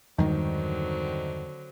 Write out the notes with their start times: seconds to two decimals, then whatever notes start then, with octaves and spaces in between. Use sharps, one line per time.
0.18 E2 G2 D3 D#3 F#3 G#3 C4